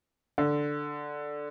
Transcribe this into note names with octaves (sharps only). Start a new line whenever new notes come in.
D3